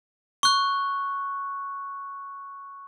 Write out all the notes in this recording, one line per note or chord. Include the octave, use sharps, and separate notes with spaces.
C#6 F#6